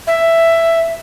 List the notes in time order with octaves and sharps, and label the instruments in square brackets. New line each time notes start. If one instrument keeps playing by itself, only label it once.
[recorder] E5